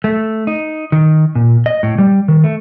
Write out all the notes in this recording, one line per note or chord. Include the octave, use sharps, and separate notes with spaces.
A3
D#4
D#3
A#2
D#5
A2
G3
D#3
A3